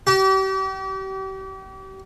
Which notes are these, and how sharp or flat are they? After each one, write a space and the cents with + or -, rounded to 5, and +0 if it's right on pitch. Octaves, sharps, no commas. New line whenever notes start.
G4 -35